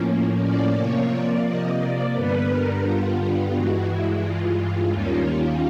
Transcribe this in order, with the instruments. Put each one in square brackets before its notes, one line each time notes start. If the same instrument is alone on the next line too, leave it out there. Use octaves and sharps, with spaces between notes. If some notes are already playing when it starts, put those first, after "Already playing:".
Already playing: [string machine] A2 F3 A#3 C#4
D5
C3 F3 A#3 C#5
D5
D#5
D5
G2 D3 G3 B3 B4
A#4
F4
G2 E3 G#3 F#4
E4
F4
F4
D#2 D#3 G3 A#3 C#4